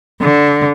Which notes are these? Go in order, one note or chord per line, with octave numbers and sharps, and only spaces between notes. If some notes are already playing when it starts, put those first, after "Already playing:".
D3